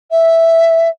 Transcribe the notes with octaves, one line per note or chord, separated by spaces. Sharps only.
E5